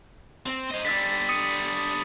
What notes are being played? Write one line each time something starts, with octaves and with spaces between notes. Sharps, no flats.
C4
C5 D#5
D3 G3 E6 A6 B6
D#6 C#7 D#7